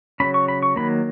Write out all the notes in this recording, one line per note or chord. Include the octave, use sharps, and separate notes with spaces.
C#3 F#3 A#3 C#4 B5
C#6
B5
C#6
D#3 F#3 A#3 B5